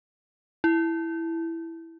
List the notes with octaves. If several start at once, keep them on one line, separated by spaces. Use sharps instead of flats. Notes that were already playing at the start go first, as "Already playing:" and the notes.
E4